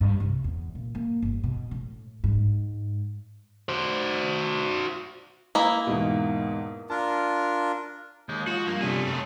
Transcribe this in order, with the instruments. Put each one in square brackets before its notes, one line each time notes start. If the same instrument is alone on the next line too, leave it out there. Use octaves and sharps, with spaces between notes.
[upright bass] G2
C2
E2
A#2
A#3
G1
B2
A2
G#2
[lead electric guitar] F#4 C5
[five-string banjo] A#3 E4 [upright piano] B4 D#5 D#6
[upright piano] E2 G#2 B2
[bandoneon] D4 F4 A#4 [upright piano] A5
[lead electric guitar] D#2 [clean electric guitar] G#3 [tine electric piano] G6
[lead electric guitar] F3 F4 [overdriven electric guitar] F#4
[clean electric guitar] G2 [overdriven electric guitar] A#3
[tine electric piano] C3 B3 C4 [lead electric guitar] F3 G3 [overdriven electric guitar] A3 G#4
[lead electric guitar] F#2